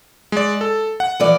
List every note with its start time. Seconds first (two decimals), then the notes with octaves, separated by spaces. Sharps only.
0.32 G#3 D5
0.61 A4
1.00 F#5
1.20 E3 F3 D5